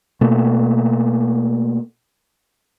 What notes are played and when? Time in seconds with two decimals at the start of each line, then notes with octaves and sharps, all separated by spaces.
0.21 B2 A3 A#3